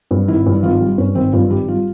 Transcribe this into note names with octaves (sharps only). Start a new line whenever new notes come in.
G2
G#1 E4
G2
G#1 F4
G3
G2 C#4
G#1 C4
G2 F4
G#1 G4
G3 F4